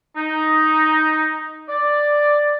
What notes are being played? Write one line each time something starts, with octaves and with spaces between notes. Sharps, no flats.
D#4
D5